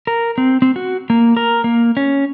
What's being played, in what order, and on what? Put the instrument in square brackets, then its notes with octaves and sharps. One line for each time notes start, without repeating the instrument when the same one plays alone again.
[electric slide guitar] A#4
C4
C4
F#4
A#3
A#4
A#3
C#4